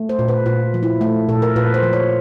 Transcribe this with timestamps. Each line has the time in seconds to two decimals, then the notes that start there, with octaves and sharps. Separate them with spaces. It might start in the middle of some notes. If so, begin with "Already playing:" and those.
Already playing: A3
0.09 C5
0.19 A#2
0.28 B4
0.46 A#2 F4
0.74 F3
0.83 E4
1.01 A3
1.29 A#2 A4
1.42 A#4
1.56 A#2 B4
1.74 C5
1.83 F3
1.93 C#5